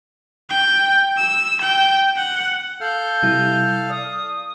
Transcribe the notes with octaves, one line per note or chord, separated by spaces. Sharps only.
G5
E6
G5
F#5
A4 F5 F6 G6
C3 G3 E4
D5 D#6